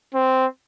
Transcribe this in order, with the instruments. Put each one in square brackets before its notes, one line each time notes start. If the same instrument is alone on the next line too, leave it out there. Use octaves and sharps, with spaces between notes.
[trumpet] C4